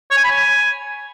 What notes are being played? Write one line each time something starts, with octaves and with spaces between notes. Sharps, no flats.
C#5
G#5
B5
G#5